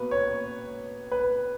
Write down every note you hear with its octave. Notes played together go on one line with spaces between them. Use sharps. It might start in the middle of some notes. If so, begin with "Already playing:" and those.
Already playing: B2 A#3 B4
C#5
B4